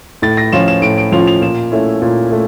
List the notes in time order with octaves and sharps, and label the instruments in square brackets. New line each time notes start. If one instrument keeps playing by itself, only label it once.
[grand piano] A2 A6
A#6
F3 C#4 F4 E7
E7
A2 D7
D7
F3 C#4 F4 F7
F7
A#2 E7
A3 C#4 E4
A#2
A3